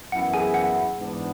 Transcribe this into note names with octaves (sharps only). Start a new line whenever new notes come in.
F#2 E3 B3 E4 F#5
G#4 G#5
F#5
G#2 E3 B3 D4